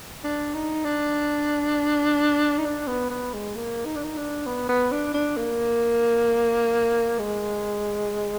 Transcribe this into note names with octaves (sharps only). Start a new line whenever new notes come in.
D4
D#4
D4
D#4
D4
B3
B3
G#3
A#3
D#4
D4
D#4
D4
B3
B3
D4
D4
A#3
G#3